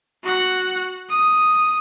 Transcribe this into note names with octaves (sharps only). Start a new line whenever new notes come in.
F#4 F#5
D#6